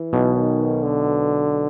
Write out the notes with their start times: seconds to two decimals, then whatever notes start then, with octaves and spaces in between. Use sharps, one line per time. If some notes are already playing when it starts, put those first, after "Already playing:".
Already playing: E3
0.13 B1 B2
0.36 D#3
0.83 D3